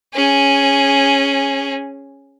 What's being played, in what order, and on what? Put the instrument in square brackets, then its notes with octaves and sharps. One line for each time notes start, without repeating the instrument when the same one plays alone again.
[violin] C#4 G#4